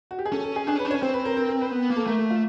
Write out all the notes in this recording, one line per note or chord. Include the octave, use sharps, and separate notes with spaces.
F#4
G4
G#4
C#4 A4
A4
G#4
D4 G#4
C#4 B4
D4
C#5
C#4
C4 C5
B4
A#4
A#4
A#4
B4
B3
A#3
A4
A3 A#4
A4
F4